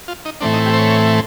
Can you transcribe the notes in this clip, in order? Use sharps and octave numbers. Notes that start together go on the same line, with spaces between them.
F4
D#4
A2 E3 A3 C4 D4
D#4
G4
C5
C#5